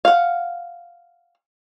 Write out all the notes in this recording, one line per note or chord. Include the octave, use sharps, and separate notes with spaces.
F5 F#5